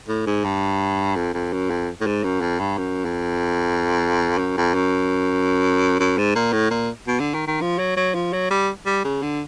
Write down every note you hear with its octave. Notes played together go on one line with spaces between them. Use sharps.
A2
G#2
G2
F2
F2
F#2
F2
A2
G#2
F#2
F2
G2
F#2
F2
F#2
F2
F#2
F#2
G#2
A#2
A2
A#2
B2
D3
D#3
D#3
F3
F#3
F#3
F3
F#3
G3
G3
C#3
D3